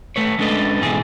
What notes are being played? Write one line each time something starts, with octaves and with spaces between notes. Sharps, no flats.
A3 B4 C#5
G#3 C#4 D4 A4 B4 D#5
G#2 B2 E3 G#4